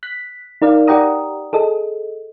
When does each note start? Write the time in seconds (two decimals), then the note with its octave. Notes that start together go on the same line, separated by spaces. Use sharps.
0.03 F#6 B6
0.62 D#4 A#4 D5 F5
0.88 G4 D5 F#5 G5 A#5 D#6
1.53 G#4 A4 D#5